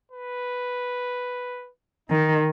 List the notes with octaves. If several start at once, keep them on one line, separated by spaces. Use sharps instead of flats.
B4
D#3 D#4